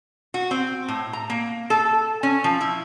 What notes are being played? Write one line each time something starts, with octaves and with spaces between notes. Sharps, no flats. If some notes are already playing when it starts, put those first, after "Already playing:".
F#4
C4
A2
A#5
A#3
A4
C#4
F3
E4